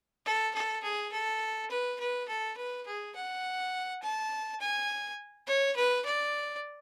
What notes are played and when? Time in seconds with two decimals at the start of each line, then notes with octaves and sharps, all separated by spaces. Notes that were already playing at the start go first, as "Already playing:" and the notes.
0.25 A4
0.54 A4
0.83 G#4
1.12 A4
1.71 B4
2.00 B4
2.28 A4
2.57 B4
2.87 G#4
3.15 F#5
4.03 A5
4.60 G#5
5.47 C#5
5.76 B4
6.05 D5